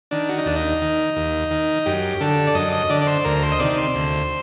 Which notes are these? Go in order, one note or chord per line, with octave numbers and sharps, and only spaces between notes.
D#3 D4
F#4
D#4
D#2 D4
D#4
D#3
D#2
D#3
F#2 G4
D3 A4
D5
F#2 D#5
D#5
D3 D5
D5
C5
D2 A#4
C5
D#5
C3 D#3 D5
C5
D2